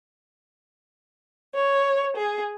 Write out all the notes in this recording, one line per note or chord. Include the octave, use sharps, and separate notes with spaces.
C#5
G#4